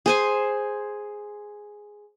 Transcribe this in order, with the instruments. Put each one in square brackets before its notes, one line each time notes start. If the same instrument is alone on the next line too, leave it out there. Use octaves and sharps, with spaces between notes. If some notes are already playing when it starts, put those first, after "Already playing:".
[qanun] G#4 C5 G#5